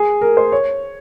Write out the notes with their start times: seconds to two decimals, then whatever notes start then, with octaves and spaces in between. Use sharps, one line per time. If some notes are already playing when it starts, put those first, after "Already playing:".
Already playing: G#4
0.21 A#4
0.37 C5
0.52 C#5